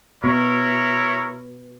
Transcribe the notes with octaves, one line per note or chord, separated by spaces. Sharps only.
B2 E4 A#4 C#5